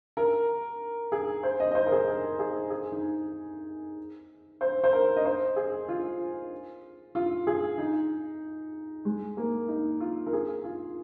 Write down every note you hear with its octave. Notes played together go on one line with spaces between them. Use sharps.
A#4
G#4
C5
D#5
D#5
C5
A#4
G#4
A#4
G#4
G#4
D#4
C5
C5
A#4
D#5
C5
G#4
F4
F4
G#4
D#4
G#3
A#3
D#4
F4
A#4
G#4
F4